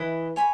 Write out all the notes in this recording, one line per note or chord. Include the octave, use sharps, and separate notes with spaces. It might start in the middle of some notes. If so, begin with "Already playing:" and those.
Already playing: E3 E4 B4 D#5
C#5 G#5 B5